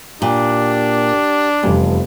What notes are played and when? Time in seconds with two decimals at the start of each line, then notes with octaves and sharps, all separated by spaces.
0.22 A#2 D4 G4
1.63 F1 E2 F3 G3